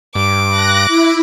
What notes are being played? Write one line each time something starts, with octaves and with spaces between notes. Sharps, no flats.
G2 D6
F#6 A#6
E4